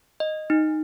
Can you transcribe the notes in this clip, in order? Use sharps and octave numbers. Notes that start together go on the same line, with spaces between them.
D#5
D#4